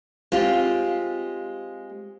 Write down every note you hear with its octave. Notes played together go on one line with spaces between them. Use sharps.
G#3 C4 F4 G4